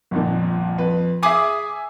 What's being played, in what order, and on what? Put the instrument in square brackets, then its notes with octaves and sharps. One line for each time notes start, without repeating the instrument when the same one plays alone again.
[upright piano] G1 F2 A#2
F2 B4
[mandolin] G#4 D6 D#6 [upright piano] E5 G#5